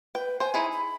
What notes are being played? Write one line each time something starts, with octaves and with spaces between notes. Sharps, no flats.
B4 G5
C5 G5 G#5
D#4 E4 G#4
B5